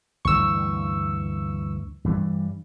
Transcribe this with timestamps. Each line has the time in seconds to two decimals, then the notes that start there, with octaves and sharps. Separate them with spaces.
0.25 D2 G2 E3 C#6 E6
2.04 G2 E3 G3